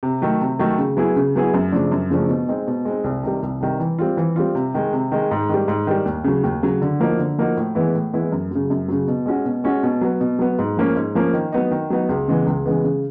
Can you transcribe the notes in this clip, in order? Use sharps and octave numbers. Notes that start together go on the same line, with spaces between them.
C3
D#3 F#3 A3
C3
D#3 F#3 A3
C#3
F#3 B3 E4 G#4
C#3
F#3 B3 E4 G#4
F#2
C#3 F3 A3 D4
F#2
C#3 F3 A3 D4
B2
G#3 C4 D#4
B2
G#3 C4 D#4
C2
C3 D#3 G3
C2
C3 D#3 G3
E3
G3 C4 F4
E3
G3 C4 F4
C3
D#3 G#3
C3
D#3 G#3
G#2
D#3 G3
G#2
D#3 G3
D#2
C#3 F#3
D#2
C#3 F#3
D3
F3 A#3 D#4 F#4
D3
F3 A#3 D#4 F#4
A2
E3 G#3 B3 E4
A2
E3 G#3 B3 E4
F#2
C#3 F#3
F#2
C#3 F#3
B2
G#3 C#4 F#4
B2
G#3 C#4 F#4
B2
F#3 B3
B2
F#3 B3
G#2
F3 A#3 C#4
G#2
F3 A#3 C#4
D#3
F#3 B3 D#4
D#3
F#3 B3 D#4
C#2
C#3 E3 G#3 B3
C#2
C#3 E3 G#3 B3
C#3